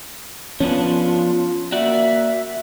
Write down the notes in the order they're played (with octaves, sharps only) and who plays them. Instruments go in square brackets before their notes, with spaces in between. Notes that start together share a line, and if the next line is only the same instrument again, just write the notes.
[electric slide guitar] F3 B3 D4 [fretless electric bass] C#4 [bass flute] F4
[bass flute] A#3 [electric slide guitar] F#4 D5 [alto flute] E5